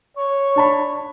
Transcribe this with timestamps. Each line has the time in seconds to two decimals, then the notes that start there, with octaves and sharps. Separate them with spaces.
0.17 C#5 C#6
0.56 D4 A5 B5